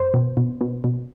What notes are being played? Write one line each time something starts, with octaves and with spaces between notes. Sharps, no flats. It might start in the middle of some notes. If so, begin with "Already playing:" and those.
Already playing: F#2 C5
B2
B2
B2
B2